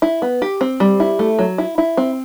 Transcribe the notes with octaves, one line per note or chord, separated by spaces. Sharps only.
E4
B3
G4
C4
G3
E4
A3
F#3
E4
E4
C4